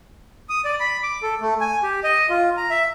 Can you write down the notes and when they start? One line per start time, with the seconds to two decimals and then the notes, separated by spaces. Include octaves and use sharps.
0.49 D#6
0.65 D5
0.80 B5
1.03 D6
1.23 A4
1.41 A3
1.61 G#5
1.83 G4
2.04 D#5
2.30 F4
2.57 A#5
2.70 E5